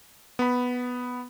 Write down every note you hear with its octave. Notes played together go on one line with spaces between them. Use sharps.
B3 B5